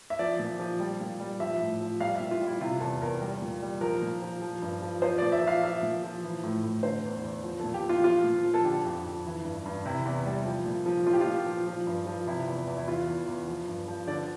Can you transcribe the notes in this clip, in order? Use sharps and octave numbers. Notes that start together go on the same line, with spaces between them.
E5
F3 D5
A#2
F3
G3
A#2
G3
F3 E5
A2
F3
G3 F5
E5
A#2
F4
G3 E4
C3 F4
E2 A4
E2 A#4
G3
A#2
G3
F3 A#4
A#2
F3
F3
G2
F3
F3 C5
D5
A#2
E5
F3 F5
F3 E5
A#2
F3
E3
A2
A2
D3 C5
E2
E2
F3
A4
A#2
G4
F3
F4
F3 F4
A#2
F3
A4
D3 G4
F2
F2
E3
G2
G2
C3 E4
E2
G3
F3
A#2
F3
F3 F4
G4
F4
A#2
F3
F3
G2
F3
C3 E4
E2
E2
E4
E3 F4
E2
E2
F3
G2
F3
D3 D5